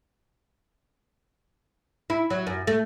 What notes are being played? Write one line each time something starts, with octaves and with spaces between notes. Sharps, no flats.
E4
F#3
F#2
A3